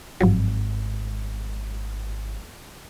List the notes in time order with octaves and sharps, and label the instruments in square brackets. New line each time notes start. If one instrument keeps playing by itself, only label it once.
[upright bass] G#1 [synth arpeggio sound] G2 F3 F#3